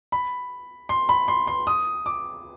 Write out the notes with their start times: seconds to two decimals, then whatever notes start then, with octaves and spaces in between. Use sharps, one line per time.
0.12 B5
0.89 C6
1.09 B5
1.28 C6
1.47 C6
1.67 D#6
2.06 D6